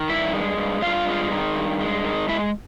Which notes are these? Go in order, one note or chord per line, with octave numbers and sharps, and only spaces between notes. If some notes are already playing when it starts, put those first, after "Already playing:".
Already playing: D#3
G2 E4 E5
G#3
G2
G2 F4 F5
G#3
D#3
G2
G#3
D#3
G#3 E4 E5